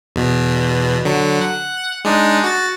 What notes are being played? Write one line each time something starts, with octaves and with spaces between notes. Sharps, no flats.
E2 B2
D3 F#3
F#5
G#3 D4 D#4
F#4 A6